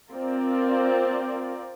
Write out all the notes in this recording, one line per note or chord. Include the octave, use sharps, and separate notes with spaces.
C4 F4 A#4 D5